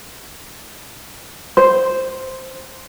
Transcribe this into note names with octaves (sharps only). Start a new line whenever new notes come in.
C5